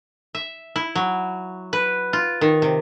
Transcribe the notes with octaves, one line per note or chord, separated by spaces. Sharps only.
E5
E4
F#3
B4
F4
D#3
C3